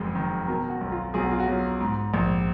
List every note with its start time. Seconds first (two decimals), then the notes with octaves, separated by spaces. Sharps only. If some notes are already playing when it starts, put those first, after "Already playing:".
Already playing: F#1 F2 G#3
0.15 D#3
0.48 B2 A#4
0.70 F#4
0.81 B1
0.92 F4
1.14 B1 G#4
1.23 F#4
1.31 F4
1.40 F#4
1.48 F#3
1.80 G#2
2.14 A#1